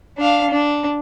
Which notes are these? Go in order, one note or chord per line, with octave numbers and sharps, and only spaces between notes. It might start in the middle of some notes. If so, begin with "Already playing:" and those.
D4 F5
D4